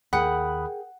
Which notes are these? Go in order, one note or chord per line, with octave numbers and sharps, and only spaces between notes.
D#2 G#4 A#4 F#5 G5 B5 D#6 F#6